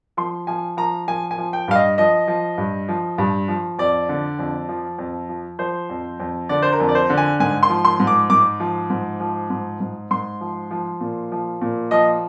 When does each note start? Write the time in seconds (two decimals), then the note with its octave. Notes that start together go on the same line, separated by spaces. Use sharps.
0.17 F3 C6
0.47 F3 G#5
0.77 F3 A#5
1.08 F3 G#5
1.31 G#5
1.38 F3
1.53 G5
1.68 G2 F5
1.75 D#5
1.98 F3 D#5
2.28 F3
2.58 G2
2.89 F3
3.18 G2
3.48 F3
3.79 F2 D5
4.09 D3
4.39 F2
4.69 F3
4.99 F2
5.29 F3
5.59 F3 C5
5.90 F2
6.20 F2
6.49 D3 D5
6.63 C5
6.73 A#4
6.80 F2
6.89 D5
6.95 C5
7.10 D3
7.18 G#5
7.40 G#2 G#5
7.63 C6
7.70 F3
7.85 C6
8.00 G#2
8.07 D6
8.30 G#2 D6
8.60 F3
8.90 G#2
9.20 F3
9.50 G#2
9.80 G#2
10.11 G#2 C6
10.41 F3
10.71 F3
11.01 A#2
11.32 F3
11.61 A#2
11.91 F3 D#5